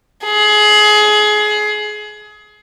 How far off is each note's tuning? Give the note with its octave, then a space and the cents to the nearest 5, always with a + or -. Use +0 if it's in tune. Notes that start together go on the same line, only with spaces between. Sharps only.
G#4 +25